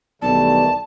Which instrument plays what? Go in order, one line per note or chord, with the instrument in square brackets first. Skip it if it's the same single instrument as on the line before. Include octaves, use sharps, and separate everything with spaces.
[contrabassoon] B1 [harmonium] D#3 G3 A3 [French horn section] E3 B4 D5 [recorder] A5